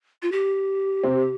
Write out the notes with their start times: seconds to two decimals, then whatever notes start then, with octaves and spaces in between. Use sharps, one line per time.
0.22 F4
0.32 G4
1.03 C3 C4